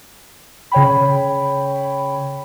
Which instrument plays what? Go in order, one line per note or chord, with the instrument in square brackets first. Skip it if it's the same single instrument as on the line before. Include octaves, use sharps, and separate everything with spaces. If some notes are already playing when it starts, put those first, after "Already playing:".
[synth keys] C#3 C#5 G5 B5